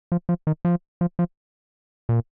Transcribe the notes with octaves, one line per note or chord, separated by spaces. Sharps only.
F3
F3
D#3
F3
F3
F3
A#2